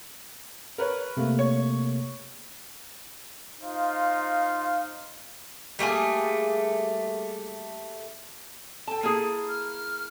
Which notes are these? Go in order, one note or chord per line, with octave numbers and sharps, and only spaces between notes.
A#4 B4 C#5
C3 A3 A#3
C#5
D#4 F4 C5 F5
G3 A3 A#3 G#4
A4 G5 A5
A#3 E4 G#4
F6